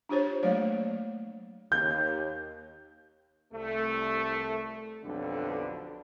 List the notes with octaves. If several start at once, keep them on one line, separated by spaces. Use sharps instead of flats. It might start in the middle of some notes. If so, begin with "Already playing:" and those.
D4 F4 G4 C5 C#5
F#3 A3 A#3 C#5 F5
D#2 G6
C2 A3
B1 F2 D3 G3 D4